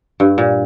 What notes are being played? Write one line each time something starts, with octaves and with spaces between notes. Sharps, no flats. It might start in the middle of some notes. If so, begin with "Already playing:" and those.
G2
A#2